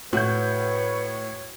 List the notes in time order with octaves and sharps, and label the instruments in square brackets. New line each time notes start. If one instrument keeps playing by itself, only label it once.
[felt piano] A2 G6 [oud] F#4 [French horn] B4 [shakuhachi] C#5